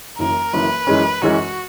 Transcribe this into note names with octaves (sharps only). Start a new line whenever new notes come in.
F#1 F#2 E3 A#4
F#1 F#2 E3 B4
F#2 E3 G#3 C#4
F#2 E3 G#3 C#4 F#4